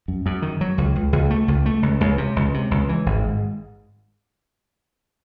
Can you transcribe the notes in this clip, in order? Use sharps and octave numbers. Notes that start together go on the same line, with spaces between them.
F#2
F#2
D#3
F#3
C#2
C#2
C#2
A3
C#2
A3
C#2
C#2
C3
C#2
C3
C#2
E3
G#1
G#2